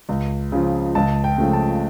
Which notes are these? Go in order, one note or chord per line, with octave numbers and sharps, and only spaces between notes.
C#2
C#3 F3
C#2 A5
G5
C#3 F3 A3
A5